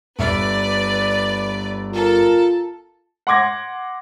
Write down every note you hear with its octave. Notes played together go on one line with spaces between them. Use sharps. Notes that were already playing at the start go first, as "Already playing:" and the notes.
G1 B4 D5 E5 F6
F4 A4 A#4
F#5 C6 D6 G#6 A#6